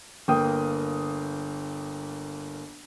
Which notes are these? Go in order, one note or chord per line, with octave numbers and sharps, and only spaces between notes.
G1 A#3 G5 D#6